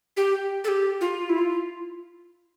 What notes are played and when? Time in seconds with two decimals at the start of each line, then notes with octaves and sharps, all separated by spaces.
0.17 G4
0.64 A4
0.68 G4
1.01 F4
1.29 E4
1.38 F4